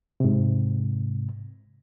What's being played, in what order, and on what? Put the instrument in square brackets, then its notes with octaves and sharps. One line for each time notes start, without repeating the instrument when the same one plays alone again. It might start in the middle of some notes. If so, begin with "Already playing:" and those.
[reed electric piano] G#2 C3